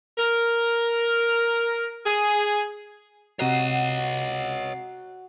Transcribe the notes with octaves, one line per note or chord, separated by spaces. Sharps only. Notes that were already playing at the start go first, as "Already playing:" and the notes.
A#4
G#4
C3 F#4 C#5 D#5 F#5 A#5 C7